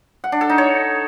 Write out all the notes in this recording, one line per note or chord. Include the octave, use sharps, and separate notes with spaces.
F#5
D4
A4
D#4
C#5